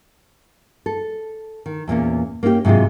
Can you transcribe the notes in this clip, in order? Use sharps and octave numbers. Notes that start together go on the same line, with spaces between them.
A4
D#3
E2 A#2 A#3 C#4
A#3 C#4 D#4 F4 G4
G#2 C3 F#3 G#3 F4